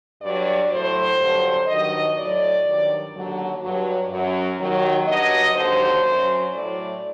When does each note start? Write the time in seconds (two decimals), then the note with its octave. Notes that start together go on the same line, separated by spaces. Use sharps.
0.21 G2 F#3 D5
0.69 A2 F#3 C5
1.18 G2 D3 F#3
1.66 G2 D#3 F#3 D#5
2.16 A2 F#3 D5
2.64 G2 D#3 F#3
3.13 D#2 D3 F#3
3.62 G2 F#3
4.10 F#2 F#3
4.58 D#2 D#3 F#3
5.06 G2 F#3 D#5
5.55 D#2 D3 F#3 C5
6.05 F#2 F#3
6.53 A2 F#3 D5